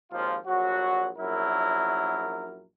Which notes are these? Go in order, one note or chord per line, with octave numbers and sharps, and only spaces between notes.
G#1 D#2 F3 A#3 F4
A#1 F#3 F#4
A#1 F#2 F#3 E4 A#4